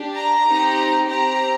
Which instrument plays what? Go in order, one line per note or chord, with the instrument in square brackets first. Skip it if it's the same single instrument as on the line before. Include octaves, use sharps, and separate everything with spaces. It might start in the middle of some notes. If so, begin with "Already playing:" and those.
Already playing: [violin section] D4 G4
A#5
C4 D#4 G4
C4 G4 A#5